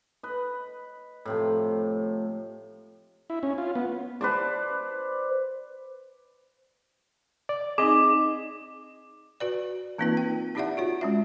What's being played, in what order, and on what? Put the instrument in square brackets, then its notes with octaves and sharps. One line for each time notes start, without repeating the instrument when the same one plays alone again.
[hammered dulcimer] B4 D#5
A2 C3 F3
[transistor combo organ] E4
C#4
F4
B3
[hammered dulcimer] B4 C5 D5
[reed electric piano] D5
[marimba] C4 D#4 [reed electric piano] G#4 D#5 [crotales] D6
[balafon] F#4 B4 D5
E3 A#3 C4 D#4 F4 B4
G5
D#4 E4 G4 D5 E5 F#5
F4 F#4 C#5
G#3 C#4 E5